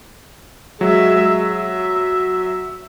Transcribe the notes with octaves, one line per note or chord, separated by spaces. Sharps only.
F#3 G#3 E5
E5